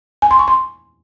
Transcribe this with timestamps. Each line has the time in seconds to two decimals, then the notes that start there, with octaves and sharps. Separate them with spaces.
0.22 G#5
0.31 C6
0.39 C#6
0.48 C6